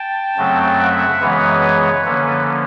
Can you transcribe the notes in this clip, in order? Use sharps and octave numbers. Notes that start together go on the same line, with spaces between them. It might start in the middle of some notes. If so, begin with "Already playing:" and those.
Already playing: G5 A5
F#2 C#3 F#3 A3 C4
E5 F#5
F#2 C#3 E3 G#3 B3 B4 C#5
D3 F3 A#3 C#4 A4 B4